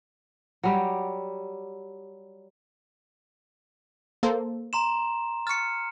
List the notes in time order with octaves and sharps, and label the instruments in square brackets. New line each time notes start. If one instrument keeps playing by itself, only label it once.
[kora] F#3 G3 G4
[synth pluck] A#3 A4 C5
[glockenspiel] A#5 C6 E7
[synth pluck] C#6 A6 [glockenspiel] F6 C#7